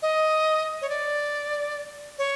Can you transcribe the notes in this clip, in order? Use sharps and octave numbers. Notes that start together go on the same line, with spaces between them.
D#5
C#5
D5
C#5